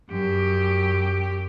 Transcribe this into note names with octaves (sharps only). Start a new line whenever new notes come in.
F#2 G4